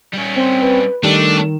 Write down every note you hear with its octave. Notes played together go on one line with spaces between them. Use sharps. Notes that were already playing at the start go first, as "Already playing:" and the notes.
G3 C#4
C4
B4
D#3 G3 A3 D4